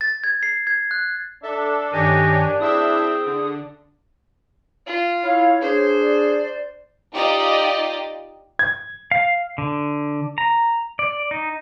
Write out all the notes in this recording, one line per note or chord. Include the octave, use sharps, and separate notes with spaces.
A6
G#6
C7
G#6
F#6
D4 A4 E5
G2 D#3 D#4 G4 C#5 G#5
C4 E4 G#4 E5 D#6 E6
D3
F4
E4 C#5 F5
D4 G#4 C5
D5
D#4 F4 G4 D5 D#5
G#6
F5
D3
A#5
D5
D#4